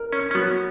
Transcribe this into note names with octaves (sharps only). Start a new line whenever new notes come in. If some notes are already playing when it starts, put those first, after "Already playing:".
Already playing: A#4
C#4
C#4
F#3 B3